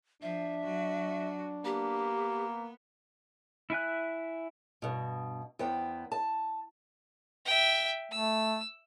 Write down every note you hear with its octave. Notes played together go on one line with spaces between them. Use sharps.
F3 D4 E5
F#3 F#4
A#3 B3 G4
E4 E5 G#5 F#6
G2 B2
E2 B3 C5 G5
A5
E5 G5
A3 E6